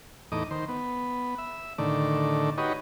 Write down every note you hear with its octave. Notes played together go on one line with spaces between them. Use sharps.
E2 A2 D#4 D#5 D6
D#3 C5
B3
E5
A2 D3 D#3 D5
D#4 F#4 G4 B4 C#5 D#5